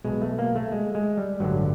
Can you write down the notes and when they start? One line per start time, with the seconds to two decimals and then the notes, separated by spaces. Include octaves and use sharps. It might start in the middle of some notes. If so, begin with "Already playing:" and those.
0.04 B1 B2 G#3
0.22 A3
0.39 A#3
0.55 A3
0.72 G#3
0.95 G#3
1.17 G3
1.40 A1 G2 D3 F#3